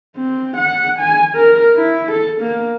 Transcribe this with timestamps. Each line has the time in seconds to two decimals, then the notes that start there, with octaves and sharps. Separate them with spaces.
0.16 C4
0.57 F#5
0.99 G#5
1.36 A#4
1.76 E4
2.11 A4
2.41 A#3